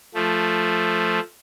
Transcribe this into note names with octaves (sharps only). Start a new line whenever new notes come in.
F3 A3